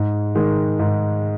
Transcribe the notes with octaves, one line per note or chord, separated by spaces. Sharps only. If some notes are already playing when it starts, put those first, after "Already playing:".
Already playing: G#2
D#3 G#3
G#2